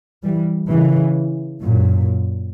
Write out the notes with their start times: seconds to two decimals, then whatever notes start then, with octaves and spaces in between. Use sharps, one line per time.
0.23 E3 G3
0.69 C#3 E3
1.61 F#2 A#2